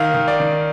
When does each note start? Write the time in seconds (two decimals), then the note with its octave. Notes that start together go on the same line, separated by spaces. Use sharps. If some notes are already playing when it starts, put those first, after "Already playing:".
Already playing: D#3 F5
0.14 D#3
0.28 D5
0.40 D#3